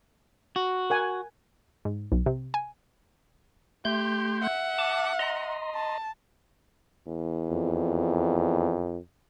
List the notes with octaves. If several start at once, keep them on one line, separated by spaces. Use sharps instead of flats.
F#4
A#4 F#5 G#5
G#2
B1
C3
G#5
A3 G4 C6 G6
E5 F#5
A5 D6
D#5 A#5 C6
A5
E2
F2